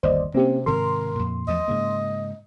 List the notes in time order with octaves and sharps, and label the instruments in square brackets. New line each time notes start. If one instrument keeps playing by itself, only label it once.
[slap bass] G1 D#2 [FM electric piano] C5 D5 D#5
[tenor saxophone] C3 [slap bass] A#3 C#4 [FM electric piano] C4 G4
[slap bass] G#2 C3 D#3 [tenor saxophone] A#4 [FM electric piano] C6
[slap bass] F2 A#2
[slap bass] E2 F3 A3 [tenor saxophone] D#5
[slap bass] G#2 C#3 A#3